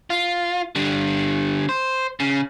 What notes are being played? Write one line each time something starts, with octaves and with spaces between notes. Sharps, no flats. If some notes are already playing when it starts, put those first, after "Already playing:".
F4
D3 G3
C5
C#3